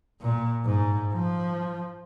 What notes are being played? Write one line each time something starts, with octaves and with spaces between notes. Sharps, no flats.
A#2
G#2
F3